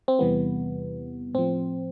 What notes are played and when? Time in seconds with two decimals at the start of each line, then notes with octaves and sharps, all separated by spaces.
0.08 C4
0.19 E2 C3 E3 G3 B3
1.34 A2 F3 C4